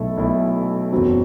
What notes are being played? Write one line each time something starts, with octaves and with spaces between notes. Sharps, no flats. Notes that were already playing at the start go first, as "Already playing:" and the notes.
Already playing: B1 B2 A3 E4 A4
B1 B2 A3 E4 A4
F#1 E2 B2 F#3 C4